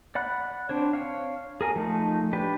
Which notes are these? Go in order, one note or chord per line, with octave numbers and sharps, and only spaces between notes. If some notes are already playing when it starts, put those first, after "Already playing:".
D5 F#5 B5 F#6
C4 D4 C5 C#5
C#5 F5
G#4 A#4 G#5
F3 A3 D#4
D4 G4 B4